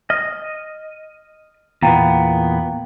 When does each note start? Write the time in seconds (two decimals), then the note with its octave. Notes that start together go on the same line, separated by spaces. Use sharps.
0.10 D#5 F6
1.82 E2 A#2 B3 F5 G5 A#5